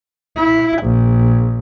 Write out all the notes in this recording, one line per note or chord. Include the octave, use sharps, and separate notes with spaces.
E4
A#1